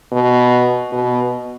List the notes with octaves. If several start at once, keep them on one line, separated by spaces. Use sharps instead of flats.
B2
B2